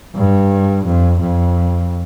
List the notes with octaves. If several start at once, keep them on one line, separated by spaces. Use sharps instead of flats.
G2
F2
F2